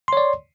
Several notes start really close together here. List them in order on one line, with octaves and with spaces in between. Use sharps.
C6 C#5 D5